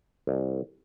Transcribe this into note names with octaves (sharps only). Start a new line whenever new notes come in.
C2